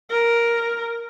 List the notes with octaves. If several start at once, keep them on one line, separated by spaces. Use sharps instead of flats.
A#4